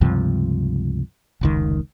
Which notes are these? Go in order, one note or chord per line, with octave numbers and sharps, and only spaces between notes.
C#2 G2 C3 F3
F1 C#2 D#3